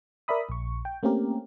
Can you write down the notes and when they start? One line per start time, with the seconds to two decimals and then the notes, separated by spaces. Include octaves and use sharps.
0.28 A#4 D5 E5 B5 D#6
0.49 A#1 C#6
0.85 G5
1.03 A3 A#3 C4 C#4 G4 A#4